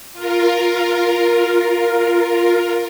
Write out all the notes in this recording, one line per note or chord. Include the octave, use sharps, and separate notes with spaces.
F4 A#4